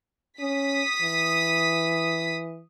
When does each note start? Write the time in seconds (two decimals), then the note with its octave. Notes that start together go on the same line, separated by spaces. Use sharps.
0.40 C#4 D#6 B6
1.02 E3